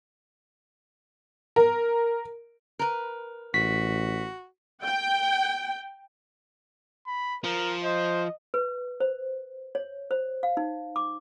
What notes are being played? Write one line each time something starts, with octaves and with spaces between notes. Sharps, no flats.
A#4
A#4 B4
A1 F#4 B6
G5
B5
F3 A#4
C5 D#5
B4
C5
C#5
C5
F5
D#4
D6